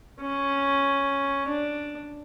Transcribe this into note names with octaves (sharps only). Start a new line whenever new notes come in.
C#4
D4